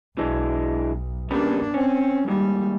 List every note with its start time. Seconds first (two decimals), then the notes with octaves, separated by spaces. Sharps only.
0.18 B1 E3 G#3 D4
1.31 C#3 G3 A#3 B3 D4
1.74 C4 C#4
2.28 D#2 G#2 G3